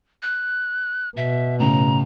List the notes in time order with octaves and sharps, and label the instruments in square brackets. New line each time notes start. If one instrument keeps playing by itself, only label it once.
[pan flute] F#6
[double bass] B2 [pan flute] E5
[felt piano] A2 C#3 [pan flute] A#5